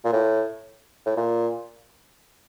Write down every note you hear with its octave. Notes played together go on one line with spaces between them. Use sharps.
A#2
A2
A2
A#2